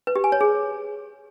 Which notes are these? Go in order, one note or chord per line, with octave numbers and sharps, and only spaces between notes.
B4
G4
G#5
C#5
G#4